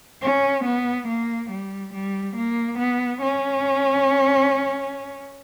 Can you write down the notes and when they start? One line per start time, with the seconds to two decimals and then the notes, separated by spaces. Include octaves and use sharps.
0.22 C#4
0.64 B3
1.08 A#3
1.50 G3
1.93 G3
2.36 A#3
2.78 B3
3.22 C#4